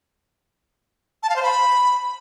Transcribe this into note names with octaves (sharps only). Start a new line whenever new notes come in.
A5
F5
C5
B5